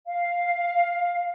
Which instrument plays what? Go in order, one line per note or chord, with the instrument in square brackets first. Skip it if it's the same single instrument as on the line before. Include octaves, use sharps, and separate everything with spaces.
[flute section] F5